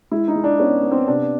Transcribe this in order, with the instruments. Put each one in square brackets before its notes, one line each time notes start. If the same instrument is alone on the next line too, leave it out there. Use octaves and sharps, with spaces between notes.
[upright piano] G#3 E4
D#4
G#3
D4
B3 C#4
B3
C4
C3 D4